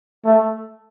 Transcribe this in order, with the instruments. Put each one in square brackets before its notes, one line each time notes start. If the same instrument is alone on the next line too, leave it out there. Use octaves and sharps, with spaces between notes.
[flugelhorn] A3